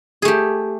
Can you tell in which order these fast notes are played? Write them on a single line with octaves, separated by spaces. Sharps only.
G#4 A3 G4